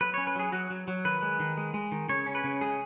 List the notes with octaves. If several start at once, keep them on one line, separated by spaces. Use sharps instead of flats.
F#3 B4
C#4 C#5
B4
F#3 G#4
F#3 F#4
F#3
F#3
D#3 B4
G#3
D#3
G#3
G#3
D#3
C#3 C#5
C#4
B4
C#3
G#3 G#4